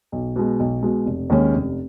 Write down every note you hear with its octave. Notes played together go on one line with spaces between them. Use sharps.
B1
B2 G#3
B1
B2 G#3
F1
D#2 D#3 G#3 C#4
F1